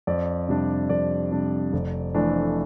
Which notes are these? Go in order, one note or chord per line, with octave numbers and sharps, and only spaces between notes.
F2 D5
C3 G3 D4
F2 D5
C3 G3 D4
F1
F2 E3 A3 D4